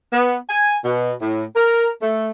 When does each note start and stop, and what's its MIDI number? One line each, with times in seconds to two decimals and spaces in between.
0.13 0.37 59
0.50 0.76 80
0.85 1.12 47
1.21 1.44 45
1.56 1.89 70
2.01 2.30 57